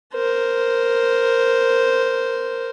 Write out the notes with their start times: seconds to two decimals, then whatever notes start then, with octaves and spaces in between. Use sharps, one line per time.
0.14 A#4 C5